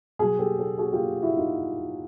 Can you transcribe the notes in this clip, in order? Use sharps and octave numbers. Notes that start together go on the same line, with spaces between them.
B2 F#3 F#4 G#4
G4 A4
G4 A4
F#4 G#4
F4 G4
E4 F#4
D#4 F4